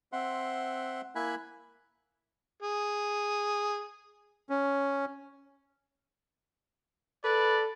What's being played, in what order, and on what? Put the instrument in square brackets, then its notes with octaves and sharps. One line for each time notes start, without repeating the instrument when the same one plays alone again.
[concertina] C4 E5 F#5 C6
A#3 E4 E5 G#5 B5 F#6
[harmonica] G#4
[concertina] C#4
[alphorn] A4 [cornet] B4 [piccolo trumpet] D5